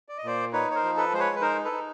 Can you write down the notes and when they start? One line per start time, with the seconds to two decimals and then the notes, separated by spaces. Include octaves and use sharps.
0.09 D5
0.18 D#5
0.24 A#2 C5 D5
0.53 D#4 B4 C#5
0.71 C#5
0.75 A#4 C5
0.83 F3
0.97 A4 B4
1.13 G#3 C5
1.19 B4 C#5
1.36 B4
1.42 D#4 A#4 C5
1.64 A4 B4
1.72 D#4